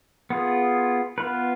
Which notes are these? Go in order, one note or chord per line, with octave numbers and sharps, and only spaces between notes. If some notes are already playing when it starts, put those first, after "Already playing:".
B3 F4 G#4
B3 F4 B4